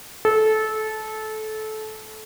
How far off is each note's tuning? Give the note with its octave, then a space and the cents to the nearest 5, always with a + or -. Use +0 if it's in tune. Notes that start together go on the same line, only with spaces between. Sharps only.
A4 -20